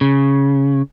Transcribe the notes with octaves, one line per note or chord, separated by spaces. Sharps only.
C#3